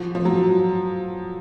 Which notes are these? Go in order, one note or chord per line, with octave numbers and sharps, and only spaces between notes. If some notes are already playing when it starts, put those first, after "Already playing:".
Already playing: F3
F3
F#3